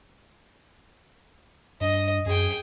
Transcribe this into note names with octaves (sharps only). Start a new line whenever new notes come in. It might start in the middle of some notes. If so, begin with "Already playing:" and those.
G2 D#5
F#2 G#4 G5